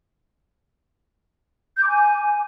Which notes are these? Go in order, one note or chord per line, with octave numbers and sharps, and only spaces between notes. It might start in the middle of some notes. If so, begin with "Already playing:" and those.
G6
D6
G#5